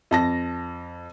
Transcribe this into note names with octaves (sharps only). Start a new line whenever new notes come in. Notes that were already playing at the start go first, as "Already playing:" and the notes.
F2 A5 A#6